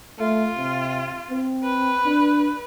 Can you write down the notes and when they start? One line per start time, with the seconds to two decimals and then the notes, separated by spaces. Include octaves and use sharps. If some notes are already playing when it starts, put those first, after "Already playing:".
0.20 A3 F4
0.57 C3
1.31 C4
1.64 B4
2.05 D4